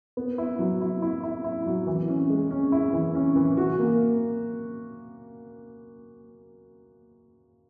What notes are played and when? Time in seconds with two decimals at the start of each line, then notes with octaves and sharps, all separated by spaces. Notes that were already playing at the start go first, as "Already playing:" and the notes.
0.17 B3
0.38 E4
0.59 F#3
0.81 E4
1.02 E4
1.23 E4
1.44 E4
1.66 F#3
1.87 E3
2.08 C#4
2.30 G#3
2.51 C#4
2.72 E4
2.93 E3
3.15 C#4
3.36 E3
3.57 F#4
3.79 A#3